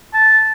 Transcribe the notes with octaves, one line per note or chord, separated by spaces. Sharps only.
A5